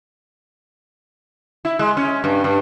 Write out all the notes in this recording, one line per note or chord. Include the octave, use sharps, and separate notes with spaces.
E4
G#3
C#4
G2
G2